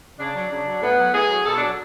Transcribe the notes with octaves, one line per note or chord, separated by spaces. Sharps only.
C#3 D4
F#3
C#3 D4
F#3
A2 B3
F#3
A2 G#4
F#3
B2 A4
D4
F#3